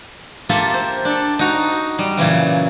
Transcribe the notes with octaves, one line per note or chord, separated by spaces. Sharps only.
A#3 F4 G4 A4 E5
C5
D4 A4
D#4 F#4 A#5
G3
A#2 C#3 E3 F#3